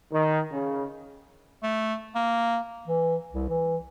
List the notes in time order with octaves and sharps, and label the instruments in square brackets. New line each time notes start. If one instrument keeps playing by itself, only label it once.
[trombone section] D#3
C#3
[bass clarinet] A3
A#3
E3
C2
E3